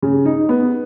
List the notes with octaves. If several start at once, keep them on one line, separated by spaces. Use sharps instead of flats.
C#3
D#4
B3